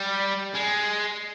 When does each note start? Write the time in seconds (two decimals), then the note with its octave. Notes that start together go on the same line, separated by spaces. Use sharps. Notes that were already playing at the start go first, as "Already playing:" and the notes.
Already playing: G3
0.55 G#3